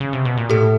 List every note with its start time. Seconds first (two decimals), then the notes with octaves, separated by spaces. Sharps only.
0.00 C#3
0.13 C3
0.25 B2
0.37 A#2
0.49 A2 G4 A4